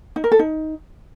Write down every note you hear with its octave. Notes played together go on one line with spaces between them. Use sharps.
D#4
A#4
A4
D#4